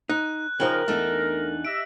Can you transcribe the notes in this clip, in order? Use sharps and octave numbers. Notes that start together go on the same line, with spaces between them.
D#4 F#6
C#3 F3 D#4 A#4 G5 F#7
E2 A3 D4 D#4
G4 D#5 E5 D7